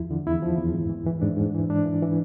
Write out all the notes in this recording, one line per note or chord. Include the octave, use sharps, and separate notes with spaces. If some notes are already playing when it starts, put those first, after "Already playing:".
Already playing: E2 F3 E4
D3
E2 E4
F3
E2
G#2
E3
E3
G#2 D4
G#2
E3
G#2 D4
E3
E3